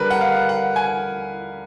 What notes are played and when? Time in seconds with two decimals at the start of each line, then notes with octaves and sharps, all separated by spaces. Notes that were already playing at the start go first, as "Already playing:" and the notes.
Already playing: D3 G3 A#4 B4
0.10 F#5
0.21 F5
0.49 F#5
0.76 G#5